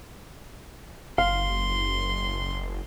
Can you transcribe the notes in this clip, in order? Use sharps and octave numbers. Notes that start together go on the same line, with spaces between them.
F#1 F5 C6